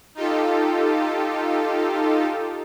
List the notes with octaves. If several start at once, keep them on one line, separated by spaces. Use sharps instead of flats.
D#4 F4 G4 A4